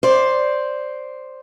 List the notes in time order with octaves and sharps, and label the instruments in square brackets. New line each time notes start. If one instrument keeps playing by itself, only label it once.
[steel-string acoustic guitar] C5 D5